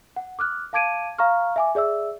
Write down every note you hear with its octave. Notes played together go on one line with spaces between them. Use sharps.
F#5
D6 F6 F#6
F5 A5 D6 G#6 D7 D#7
F5 A#5 C#6 F6
E5 G#5 D6
G#4 D5 E5 E6